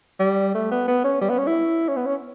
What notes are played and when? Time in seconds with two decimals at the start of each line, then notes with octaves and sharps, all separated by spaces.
0.20 G3
0.55 A3
0.72 B3
0.88 B3
1.04 C#4
1.22 G3
1.30 B3
1.38 C#4
1.47 E4
1.88 C#4
1.97 B3
2.06 C#4